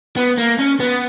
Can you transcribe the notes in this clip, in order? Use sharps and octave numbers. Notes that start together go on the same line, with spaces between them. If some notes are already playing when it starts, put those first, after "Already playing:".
B3
A#3
C#4
B3